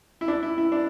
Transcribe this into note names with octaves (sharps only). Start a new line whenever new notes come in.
E4
D4
E4
E4
D4